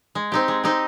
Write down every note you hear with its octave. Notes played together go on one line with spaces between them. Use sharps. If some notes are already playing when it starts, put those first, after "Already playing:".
G#3
C4 D#4 G4
G#3
C4 D#4 G4